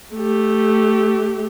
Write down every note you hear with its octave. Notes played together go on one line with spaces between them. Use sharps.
A3 G4